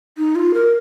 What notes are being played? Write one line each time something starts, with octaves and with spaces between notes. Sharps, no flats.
D#4
F4
A#4